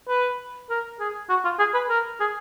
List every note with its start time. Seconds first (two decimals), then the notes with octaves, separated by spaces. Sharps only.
0.08 B4
0.70 A#4
1.00 G#4
1.29 F#4
1.44 F4
1.59 G#4
1.74 B4
1.89 A#4
2.20 G#4